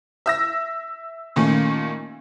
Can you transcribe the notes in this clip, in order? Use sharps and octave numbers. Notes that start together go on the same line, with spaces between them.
E5 E6 A#6
A#2 D#3 A3 C#4